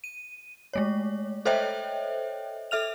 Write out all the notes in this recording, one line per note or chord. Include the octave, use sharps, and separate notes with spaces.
D#7
G#3 A3 C#5
A4 C5 C#5 D#5 E5 G5
A4 E5 F6 F7